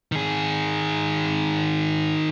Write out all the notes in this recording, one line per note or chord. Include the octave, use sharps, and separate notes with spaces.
D#3 G#4